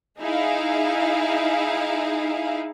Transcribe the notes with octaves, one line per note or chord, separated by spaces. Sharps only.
D#4 E4 G#4 F5